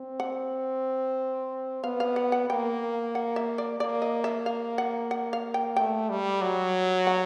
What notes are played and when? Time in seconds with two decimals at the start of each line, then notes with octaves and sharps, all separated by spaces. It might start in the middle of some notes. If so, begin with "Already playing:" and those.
Already playing: C4
0.20 F#5
1.83 B3 F5
2.00 F5
2.16 F#5
2.32 F#5
2.50 A#3 G5
3.15 F#5
3.36 E5
3.58 D5
3.80 A#3 D5
4.02 D#5
4.24 E5
4.46 F5
4.78 F#5
5.11 F#5
5.33 F5
5.54 G5
5.76 A3 G5
6.10 G3
6.41 F#3
7.07 F#5